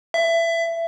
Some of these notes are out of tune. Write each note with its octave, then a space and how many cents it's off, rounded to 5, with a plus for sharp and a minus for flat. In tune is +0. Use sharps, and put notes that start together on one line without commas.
E5 +20